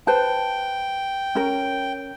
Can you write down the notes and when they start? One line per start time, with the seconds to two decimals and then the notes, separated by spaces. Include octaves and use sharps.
0.07 B4 C5 G5 A5
1.35 C#4 A#4